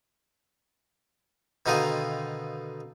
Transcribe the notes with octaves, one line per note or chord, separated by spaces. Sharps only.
B2 D3 D#3 D#4 F4 D#6